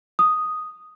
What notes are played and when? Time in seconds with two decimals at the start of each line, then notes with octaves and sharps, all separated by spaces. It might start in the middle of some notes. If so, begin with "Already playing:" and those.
0.19 D#6